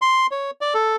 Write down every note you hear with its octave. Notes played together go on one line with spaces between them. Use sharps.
C6
C#5
D5
A4